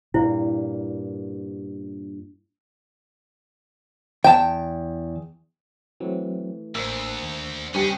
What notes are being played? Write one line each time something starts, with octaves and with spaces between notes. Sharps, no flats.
G2 A#2 E4
E2 G5 A5
E3 F#3 A3 C4
A1 D2 A#3 A#4 C5 E6
D#2
G2 C#4 G4 G#4